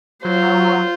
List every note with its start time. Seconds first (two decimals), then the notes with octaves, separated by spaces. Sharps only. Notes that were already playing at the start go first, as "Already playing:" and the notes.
0.25 F#3 F4 C5